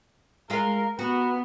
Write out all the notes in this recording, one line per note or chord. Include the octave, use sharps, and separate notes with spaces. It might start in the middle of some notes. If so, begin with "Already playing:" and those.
G#3 F4 A#4 F5
B3 F#4